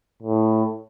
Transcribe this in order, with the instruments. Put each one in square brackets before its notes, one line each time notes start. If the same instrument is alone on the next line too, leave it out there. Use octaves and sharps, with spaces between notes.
[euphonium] A2